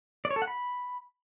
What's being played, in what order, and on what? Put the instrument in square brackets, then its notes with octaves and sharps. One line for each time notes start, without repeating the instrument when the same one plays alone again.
[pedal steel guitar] D5
C#5
A4
F#5
B5